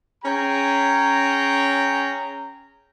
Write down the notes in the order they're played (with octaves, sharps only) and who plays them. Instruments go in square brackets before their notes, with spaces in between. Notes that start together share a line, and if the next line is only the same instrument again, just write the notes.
[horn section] C#4 G#4 G5 A#5